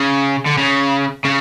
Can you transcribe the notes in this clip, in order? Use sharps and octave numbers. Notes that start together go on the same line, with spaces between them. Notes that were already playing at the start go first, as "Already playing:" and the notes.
Already playing: C#3
D3
C#3
C#3